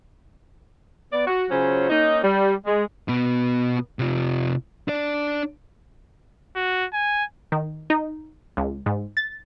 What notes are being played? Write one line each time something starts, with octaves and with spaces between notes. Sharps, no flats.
B3 D5
F#4
C#3 F#3 C#4 F4 C5
A#3 C#4 D#4
G3
G#3
B2 B3
C3 F4
D4 D5
F#4
G#5
D#3
D#4
C#2
G#2
A6